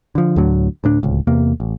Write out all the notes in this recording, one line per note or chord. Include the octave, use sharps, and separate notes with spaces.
D3 F3
D2 A2 D3 F#3
D2 A2 D4
D1 C#2
E2 C3 A#3
A1